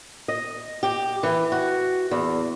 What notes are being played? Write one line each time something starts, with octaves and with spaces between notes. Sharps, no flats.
D#5
G4
E3
F#4
E2